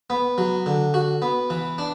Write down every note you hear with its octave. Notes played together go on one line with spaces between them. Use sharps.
B3
F#3
D3
F#4
B3
E3
D4